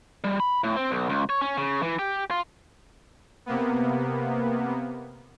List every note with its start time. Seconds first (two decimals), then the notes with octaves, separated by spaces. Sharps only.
0.24 G3
0.40 B5
0.64 A2
0.76 C4
0.91 B1
1.09 C#2
1.30 C#5
1.41 C#4
1.58 C#3
1.83 E3
1.99 G4
2.31 F4
3.46 C3 A#3 B3